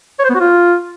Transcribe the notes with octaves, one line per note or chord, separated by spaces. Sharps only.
C#5
C5
B3
F#4
F4